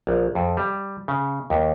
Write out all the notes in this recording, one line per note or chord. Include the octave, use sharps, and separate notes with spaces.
A#1
F2
G3
C#3
D#2